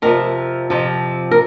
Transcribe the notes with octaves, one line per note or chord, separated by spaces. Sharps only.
F2 C3 F3 A#4
F2 C3 F3
A#4